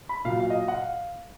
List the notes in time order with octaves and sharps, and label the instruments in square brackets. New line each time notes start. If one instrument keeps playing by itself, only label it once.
[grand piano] B5
A#2 F#3 F5
F5
D#5
F#5
F5